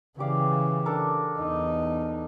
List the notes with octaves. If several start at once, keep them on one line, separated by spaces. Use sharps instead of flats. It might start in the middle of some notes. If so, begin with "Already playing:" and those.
C#3 E3 G4 D5 F5
D4 A4 A#4
E2 D#4